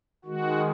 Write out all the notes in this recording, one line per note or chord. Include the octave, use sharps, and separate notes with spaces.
D#3 G#3 F#4